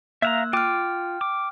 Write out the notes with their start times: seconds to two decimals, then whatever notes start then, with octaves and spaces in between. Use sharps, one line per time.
0.22 A#3 E5 F5 A#5 E6 F#6
0.53 F4 G5 D6 F6
1.21 D6